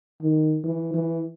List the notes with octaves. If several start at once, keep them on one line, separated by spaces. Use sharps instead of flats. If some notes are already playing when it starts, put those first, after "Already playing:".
D#3
E3
E3